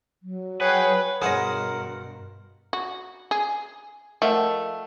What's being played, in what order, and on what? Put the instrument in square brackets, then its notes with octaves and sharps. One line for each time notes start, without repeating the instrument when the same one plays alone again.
[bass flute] F#3
[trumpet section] G#4 F#5 G5 [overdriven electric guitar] B4 [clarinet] C#5
[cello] G2 B2 [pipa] G#4 C#5 D#5 [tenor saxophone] A#4 [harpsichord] C5 F#5
[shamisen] F#4
G#4
[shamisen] F3 [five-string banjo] A3 [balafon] A#4 D#5 F#5